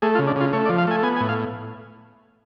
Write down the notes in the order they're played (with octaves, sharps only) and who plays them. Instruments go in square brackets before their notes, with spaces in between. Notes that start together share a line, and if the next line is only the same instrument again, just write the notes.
[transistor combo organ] A3 G#4
F4
C#3
D4
C#3 F4
A3 C#5
D5
F3
F5
A3 G#5
B3 G#5
G#5
A2
F5